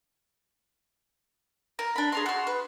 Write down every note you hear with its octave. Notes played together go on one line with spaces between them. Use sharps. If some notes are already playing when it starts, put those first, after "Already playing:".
A#4
D4 B5
G#4 A#5 C6
F#4 C6
B4